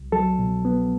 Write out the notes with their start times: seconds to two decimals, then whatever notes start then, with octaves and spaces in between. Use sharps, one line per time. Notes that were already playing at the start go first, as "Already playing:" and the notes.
Already playing: C2
0.12 F#3 A4
0.39 B2
0.65 B3